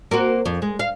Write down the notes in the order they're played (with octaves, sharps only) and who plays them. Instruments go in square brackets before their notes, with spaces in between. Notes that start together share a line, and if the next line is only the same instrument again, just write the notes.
[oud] A#3 C4 F#4
F2
G#3
F5